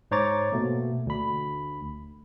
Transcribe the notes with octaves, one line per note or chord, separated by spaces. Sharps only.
G#2 C5 C#5 A#5 D6 A6
B2 A3 A#3
D2 B5